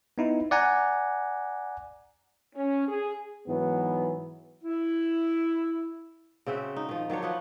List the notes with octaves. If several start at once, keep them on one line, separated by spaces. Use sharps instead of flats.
B3 D#4 E4
D5 F#5 G#5 A#5
C#4
G#4
G#2 E3 F#3 B3
E4
C#3 C4 F#4 E5
D#4
D#3 F3
D#3 F#3 D4 C#5
F3 D#4 B4 F#5